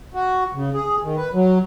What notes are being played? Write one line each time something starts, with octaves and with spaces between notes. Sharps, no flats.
F#4
C#3
G#4
D#3
B4
F#3